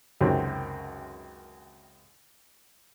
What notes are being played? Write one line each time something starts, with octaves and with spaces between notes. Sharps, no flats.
C#2 F#2 C3 D#3 C4 F#4